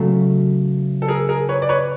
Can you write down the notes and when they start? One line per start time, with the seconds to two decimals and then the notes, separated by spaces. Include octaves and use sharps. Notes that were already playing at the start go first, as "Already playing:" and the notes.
Already playing: C#3 F#3 A3
1.02 A4
1.08 G#4 A#4
1.29 G#4 A#4
1.49 B4 C#5
1.62 D5
1.69 B4 C#5